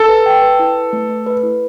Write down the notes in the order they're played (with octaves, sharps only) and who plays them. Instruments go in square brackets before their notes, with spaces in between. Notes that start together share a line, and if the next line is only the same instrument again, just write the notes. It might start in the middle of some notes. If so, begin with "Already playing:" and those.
Already playing: [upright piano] A4
[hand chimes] B4
G5
B4
E4
B4
A3
A3
B4
E4